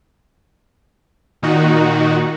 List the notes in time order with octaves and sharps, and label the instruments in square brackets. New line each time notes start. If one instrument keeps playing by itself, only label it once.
[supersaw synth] A#2 D#3 D#4 F#4